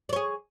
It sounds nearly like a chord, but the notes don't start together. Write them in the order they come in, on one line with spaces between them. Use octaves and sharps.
D5 C#5 G#4